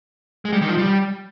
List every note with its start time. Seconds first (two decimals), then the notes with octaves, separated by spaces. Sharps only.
0.45 G#3
0.53 G3
0.61 D#3
0.69 F3
0.78 G3